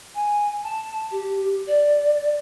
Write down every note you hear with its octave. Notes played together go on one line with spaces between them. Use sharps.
G#5
A5
G4
D5